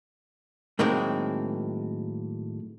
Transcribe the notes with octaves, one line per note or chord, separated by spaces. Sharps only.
A2 D#3 F#3 G#3 A#3 C4